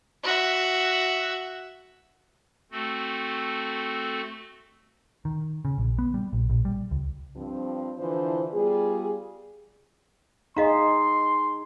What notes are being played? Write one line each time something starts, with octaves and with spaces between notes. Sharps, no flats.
F#4 E5
A3 C4 F#4 A4
D#3
C#3
A#1
B3
G3
A#1
A#1
G3
C#2
G2 F3 C4
D3 E3 F3 D4 E4 C5
G3 B3 F4 G#4
D#4 G#4 D#5 F5 A#5 C6